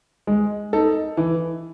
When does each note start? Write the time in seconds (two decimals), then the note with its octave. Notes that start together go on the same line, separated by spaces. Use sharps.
0.27 G#3
0.73 D#4 A4
1.17 E3